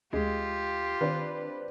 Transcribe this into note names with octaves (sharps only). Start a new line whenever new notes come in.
D2 G#3 F4 G4
D#3 C4 D4 B4